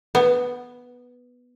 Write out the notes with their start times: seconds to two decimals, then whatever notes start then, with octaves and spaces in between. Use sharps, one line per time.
0.15 B3